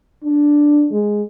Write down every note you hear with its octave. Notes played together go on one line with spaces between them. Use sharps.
D4
G#3